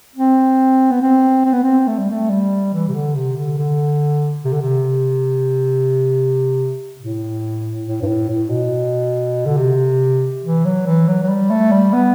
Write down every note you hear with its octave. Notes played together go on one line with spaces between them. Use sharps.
C4
B3
C4
C4
B3
C4
A3
G3
A3
G3
E3
C3
D3
C3
D3
D3
C3
D3
C3
A2
A2
G2
A2
A2
B2
D3
C3
E3
F#3
E3
F#3
F#3
G3
A3
G3
B3